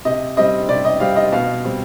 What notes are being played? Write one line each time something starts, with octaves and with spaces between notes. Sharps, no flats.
C3 D#5
G3 C4 D#5
C3 D5
D#5
G3 C4 F5
D#5
B2 F5
G3 C4